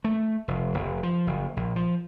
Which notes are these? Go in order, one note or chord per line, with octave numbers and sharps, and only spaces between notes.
A3
F1
F1
F3
F#1
A#1
F3